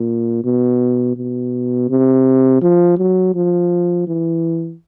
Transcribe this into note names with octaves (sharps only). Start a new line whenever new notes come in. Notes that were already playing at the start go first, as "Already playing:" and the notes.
Already playing: A#2
B2
B2
C3
F3
F#3
F3
E3